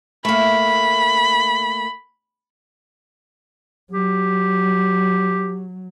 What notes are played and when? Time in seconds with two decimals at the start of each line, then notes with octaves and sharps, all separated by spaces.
0.25 A3 A#3 B5
3.92 F#3 G4